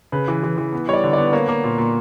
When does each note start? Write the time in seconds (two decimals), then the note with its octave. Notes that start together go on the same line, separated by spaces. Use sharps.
0.12 C#3 B4
0.28 E3
0.43 E3
0.58 E3
0.72 B3
0.88 G3 C#5
0.93 D5
1.04 D3
1.13 D5
1.18 B3
1.33 A#3 C#5
1.48 A#3
1.64 A#2
1.78 A#2